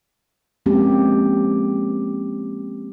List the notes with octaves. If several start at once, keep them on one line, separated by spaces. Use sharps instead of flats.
F3 G#3 A#3 C4 C#4 G4